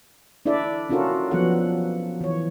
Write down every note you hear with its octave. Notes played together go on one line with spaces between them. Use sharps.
D4 E4 A4 D5 E5
C#4 D4 F4 F#4 A4 A#4
F3 F#3 B3 F#4 A4 F#5
E3 C#5